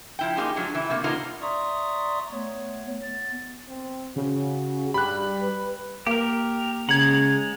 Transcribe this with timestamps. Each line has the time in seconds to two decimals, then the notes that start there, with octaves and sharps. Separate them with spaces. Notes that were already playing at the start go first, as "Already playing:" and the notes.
0.19 F3 E4 G5
0.37 A#3 D#4 F4 G4 G#4
0.56 F3 F#3 G#3 D4
0.75 E3 E4
0.90 C3 A3 A#3
1.04 A#3 B3 D4 D#4 F4 A#4
1.42 D5 E5 A#5 C6 C#6 D#6
2.32 A3 B3 C#5
3.02 B3 A6
3.68 C4
4.16 C#3 F#4
4.94 G2 G3 B5 F#6
5.42 B4
6.06 A#3 G4 A#4
6.89 C#3 G#3 F#5 A#5 G#6 F#7